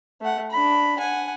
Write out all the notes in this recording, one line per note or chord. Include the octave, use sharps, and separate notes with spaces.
A3 F#5
D4 B5
F#5 G#5